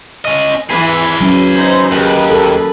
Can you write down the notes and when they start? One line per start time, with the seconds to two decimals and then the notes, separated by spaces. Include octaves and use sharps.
0.25 C#4 D#5
0.70 E3 G#4 B4
1.21 F#3 C#4
1.55 D#4 C5
1.91 D#2 G#4 B4
2.30 A4 A#4